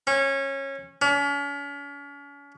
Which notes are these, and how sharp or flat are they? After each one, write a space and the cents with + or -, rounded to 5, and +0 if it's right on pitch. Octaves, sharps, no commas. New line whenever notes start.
C#4 -20
C#4 +40